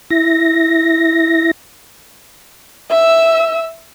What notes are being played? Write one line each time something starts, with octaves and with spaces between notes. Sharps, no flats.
E4 A#6
E5 E6